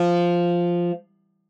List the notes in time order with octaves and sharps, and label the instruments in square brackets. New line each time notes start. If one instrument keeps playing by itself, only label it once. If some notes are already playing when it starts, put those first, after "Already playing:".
Already playing: [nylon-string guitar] F3